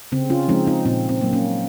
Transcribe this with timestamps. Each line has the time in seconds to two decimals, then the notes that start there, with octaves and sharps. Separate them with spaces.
0.12 C#3 C4
0.30 C#4 F4
0.48 F3 G#3 C4 D#4
0.67 C4 D#4
0.85 A#2 C4
1.09 C4
1.21 A#3
1.24 F#3
1.33 A#3 C#4